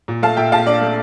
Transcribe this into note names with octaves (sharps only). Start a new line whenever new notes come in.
A#2
A3 F5 A5
A#2 E5 G5
A#1 F5 A5
D4 D5
A3